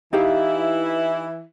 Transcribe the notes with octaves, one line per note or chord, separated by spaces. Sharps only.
E3 D#4 E4 G4 F5